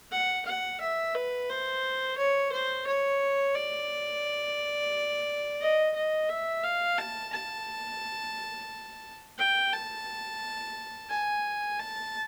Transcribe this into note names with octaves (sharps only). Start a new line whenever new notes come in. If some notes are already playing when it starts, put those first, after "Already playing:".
F#5
F#5
E5
B4
C5
C#5
C5
C#5
D5
D#5
D#5
E5
F5
A5
A5
G5
A5
G#5
A5